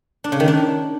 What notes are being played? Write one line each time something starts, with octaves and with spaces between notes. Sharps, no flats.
D4
C#3
D#3
D4